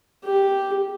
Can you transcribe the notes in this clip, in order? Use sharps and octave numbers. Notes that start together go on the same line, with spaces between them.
G4